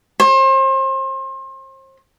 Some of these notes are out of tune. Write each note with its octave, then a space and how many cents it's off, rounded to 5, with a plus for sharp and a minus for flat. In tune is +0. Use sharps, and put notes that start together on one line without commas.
C5 +35